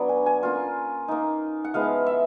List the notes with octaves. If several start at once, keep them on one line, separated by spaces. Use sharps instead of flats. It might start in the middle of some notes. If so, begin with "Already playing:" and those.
Already playing: F#3 B3 D4 D5
G#5
G#5
A#3 C#4 F4
A#3 D#4
F#5
F3 G#3 B3 E4 F5
E5